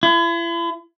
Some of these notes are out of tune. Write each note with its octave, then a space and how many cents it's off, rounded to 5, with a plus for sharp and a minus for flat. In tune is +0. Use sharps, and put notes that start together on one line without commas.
E4 +40